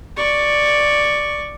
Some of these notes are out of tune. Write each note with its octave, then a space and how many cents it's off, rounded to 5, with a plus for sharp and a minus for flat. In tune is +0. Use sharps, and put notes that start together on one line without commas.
D5 +5 C#6 +0